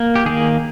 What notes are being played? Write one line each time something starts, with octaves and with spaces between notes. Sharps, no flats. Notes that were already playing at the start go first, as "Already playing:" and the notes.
Already playing: A#3
G4
D#3 A#3 G#4